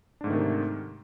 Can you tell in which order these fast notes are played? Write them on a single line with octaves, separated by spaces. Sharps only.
D4 G#2 A3 D#3 C3